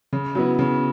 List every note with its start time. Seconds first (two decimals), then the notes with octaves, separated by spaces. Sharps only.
0.13 C#3
0.35 F#3 B3 E4
0.59 C#3